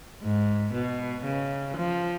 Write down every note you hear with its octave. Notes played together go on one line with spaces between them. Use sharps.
G#2
B2
C#3
F3